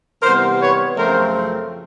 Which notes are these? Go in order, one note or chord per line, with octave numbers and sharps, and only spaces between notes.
C3 E3 G3 B3 A#4 C5
B4 C#5
F#2 C#3 F3 A3 C4 A#4 C5